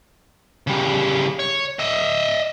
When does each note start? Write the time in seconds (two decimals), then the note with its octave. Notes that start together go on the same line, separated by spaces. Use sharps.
0.67 C#3 G3
1.39 C#5
1.79 D#5 E5